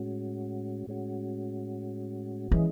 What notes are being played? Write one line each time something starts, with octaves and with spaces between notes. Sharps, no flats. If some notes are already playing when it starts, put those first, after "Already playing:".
Already playing: A2 G#3 C#4 F#4
A2 G#3 C#4 F#4
E3 G#3 C#4 E4 G#4 D#5